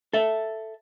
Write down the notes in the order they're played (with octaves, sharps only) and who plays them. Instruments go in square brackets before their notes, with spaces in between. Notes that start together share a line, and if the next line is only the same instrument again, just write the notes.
[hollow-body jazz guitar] A4 E5